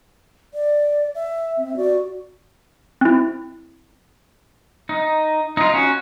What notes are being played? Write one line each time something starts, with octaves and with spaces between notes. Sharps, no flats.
D5
E5
C4
F#4 D5
C4 E4
D#4
D#4 F4
C#4 F#4